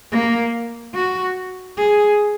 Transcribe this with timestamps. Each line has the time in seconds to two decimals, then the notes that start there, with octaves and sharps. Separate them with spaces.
0.12 A#3
0.94 F#4
1.77 G#4